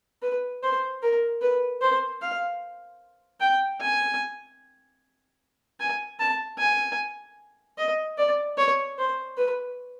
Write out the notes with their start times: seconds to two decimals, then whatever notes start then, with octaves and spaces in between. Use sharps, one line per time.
0.22 B4
0.63 C5
1.02 A#4
1.42 B4
1.82 C5
2.22 F5
3.40 G5
3.81 G#5
5.80 G#5
6.19 A5
6.59 G#5
7.78 D#5
8.18 D5
8.57 C#5
8.98 C5
9.38 B4